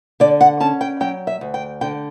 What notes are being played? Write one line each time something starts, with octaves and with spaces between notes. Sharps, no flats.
D3 D5
F#5
C#4 A5
G5
F#3 G5
E5
D2
G5
D3 G5